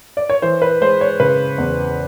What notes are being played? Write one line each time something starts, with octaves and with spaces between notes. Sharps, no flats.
D5
C#5
E3 C5
B4
G#3 C5
C#5
C#3 B4
E2